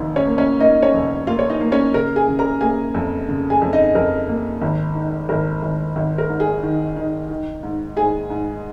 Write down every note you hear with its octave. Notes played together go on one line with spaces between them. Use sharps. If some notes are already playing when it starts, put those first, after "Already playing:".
Already playing: F1 D#2
C#4 C#5
A#3
C#4 C#5
A#3 D#4 D#5
C#4 C#5
F1
A#3 F4 F5
C#5
D#4 D#5
A#3
C#4 C#5
C#3 A#4
G#4 G#5
C#3
A#4 A#5
A#3 G#4 G#5
F2
C#3
G#4 G#5
F2
D#4 D#5
F2 A#4
A#3
G#1
D#3
G#1 A#4
G#1
G#1
A#4
G#2
G#4
D#3
D#3
D#3
G#2
G#2 G#4 G#5
G#2